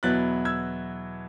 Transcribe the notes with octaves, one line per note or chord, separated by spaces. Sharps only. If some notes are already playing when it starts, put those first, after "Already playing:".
E2 B2 F#3 B3 E4 F#6 A6
E6 G#6